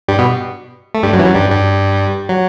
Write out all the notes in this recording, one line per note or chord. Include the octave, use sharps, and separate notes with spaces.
G2 G3
B2 B3
A3
G2 G3
F#2 F#3
E3
F#2 F#3
G2 G3
G2 G3
F#3